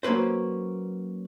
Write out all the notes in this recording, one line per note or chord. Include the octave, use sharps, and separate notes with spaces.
F#3 A#3 C#4 B4 C5